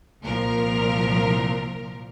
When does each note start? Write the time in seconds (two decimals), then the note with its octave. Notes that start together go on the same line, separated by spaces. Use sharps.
0.22 C2 A#2 F3 A#4